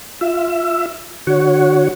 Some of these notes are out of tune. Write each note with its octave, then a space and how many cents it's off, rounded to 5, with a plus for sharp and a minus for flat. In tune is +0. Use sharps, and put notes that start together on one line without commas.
F4 +0 E5 +15
D3 +30 F#4 +0 C#5 +5